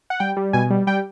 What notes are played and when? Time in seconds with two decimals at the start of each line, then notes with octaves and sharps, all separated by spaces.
0.10 F#5
0.20 G3 G5
0.37 G3
0.53 B2 G#5
0.70 G3
0.87 G3 G5